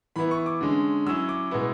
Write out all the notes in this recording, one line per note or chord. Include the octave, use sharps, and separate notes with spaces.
E3 B3 E4 B5
C#6
D6
D3 G#3 C#4
F#3 C#4 E4 E6
D6
B2 G#3 B3 E4